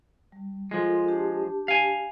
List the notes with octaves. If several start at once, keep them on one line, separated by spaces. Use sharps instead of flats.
G3
F3 G#3 F4 A4 C6
D4 G4 A5
F5 G#5